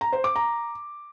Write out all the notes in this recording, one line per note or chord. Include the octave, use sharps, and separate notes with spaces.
A#5
C5
D6
A#5